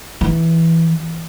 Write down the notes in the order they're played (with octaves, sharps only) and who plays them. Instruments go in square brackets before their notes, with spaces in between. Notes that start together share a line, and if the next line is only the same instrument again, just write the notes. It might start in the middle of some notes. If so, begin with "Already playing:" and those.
[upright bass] E3